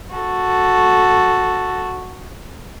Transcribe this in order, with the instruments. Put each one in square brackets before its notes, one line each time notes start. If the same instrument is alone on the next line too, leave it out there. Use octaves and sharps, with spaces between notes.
[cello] F#4 A4